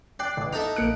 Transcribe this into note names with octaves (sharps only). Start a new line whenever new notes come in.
D5 G5 F#6 C7
A1 D6
D#4 A4 E5 F7
A#1 A#3 F#6 C#7 D7